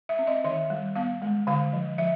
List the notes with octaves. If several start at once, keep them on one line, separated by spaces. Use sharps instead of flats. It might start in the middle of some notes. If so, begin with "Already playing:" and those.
E5
C4
D#5
D#3 E5
G3
B3 F5
G#3
D3 F5
F3
F3 E5